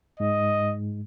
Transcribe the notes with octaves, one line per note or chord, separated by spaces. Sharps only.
G#2 G#3 D#5